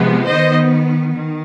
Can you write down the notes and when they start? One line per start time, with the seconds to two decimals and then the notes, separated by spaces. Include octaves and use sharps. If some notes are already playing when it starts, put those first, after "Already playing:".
Already playing: C3 F3 G#3 B3
0.28 D#3 B3 C5 D#5
1.14 D#3